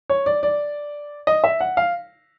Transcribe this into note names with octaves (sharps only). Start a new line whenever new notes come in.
C#5
D5
D5
D#5
E5
F#5
F5